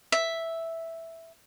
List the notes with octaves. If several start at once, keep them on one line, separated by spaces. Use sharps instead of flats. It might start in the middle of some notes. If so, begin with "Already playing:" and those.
E5